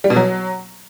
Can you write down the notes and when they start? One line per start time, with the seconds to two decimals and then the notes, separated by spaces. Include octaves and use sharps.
0.04 G3
0.10 B2
0.16 F#3